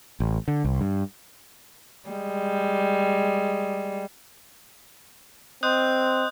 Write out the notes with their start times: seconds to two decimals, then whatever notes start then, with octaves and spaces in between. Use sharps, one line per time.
0.20 A1
0.48 D3
0.65 C2
0.81 G2
2.10 G3 G#3
5.63 C4 D#5 C6 D#6 F#6 G6